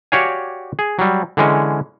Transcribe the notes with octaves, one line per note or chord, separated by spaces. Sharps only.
F#4 G4 C#5 D5 F5 G#5
G#4
F#3 G3
D3 E3 G#3 C#4